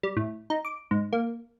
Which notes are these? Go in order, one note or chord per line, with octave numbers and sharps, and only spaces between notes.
G3
A2
D#4
D6
G#2
A#3